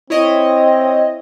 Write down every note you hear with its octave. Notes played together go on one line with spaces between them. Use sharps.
C4 E4 C#5 D#5